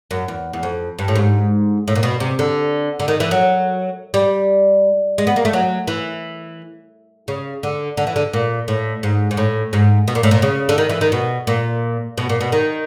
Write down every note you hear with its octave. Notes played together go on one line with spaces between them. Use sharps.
F#2
E2
E2
F2
G2
A2
G#2
A2
A#2
B2
C3
D3
D3
D#3
E3
F#3
G3
G#3
B3
A#3
A3
F#3
E3
C#3
D3
D3
E3
D3
A#2
A2
G#2
G#2
A2
G#2
B2
A#2
A2
A#2
C#3
D3
D#3
E3
D#3
B2
A#2
B2
A#2
B2
D#3